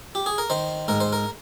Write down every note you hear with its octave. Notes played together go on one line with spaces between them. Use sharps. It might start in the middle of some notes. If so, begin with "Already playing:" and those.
G4
G#4
A#4
D#3 C5
G#2 A#4
C5
A#4